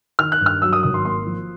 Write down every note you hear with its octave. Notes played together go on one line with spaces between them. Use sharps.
D#3 F6
F#6
G2
F6
F#3 E6
D#6
G#1 D#6
C6
A#3 C6
F3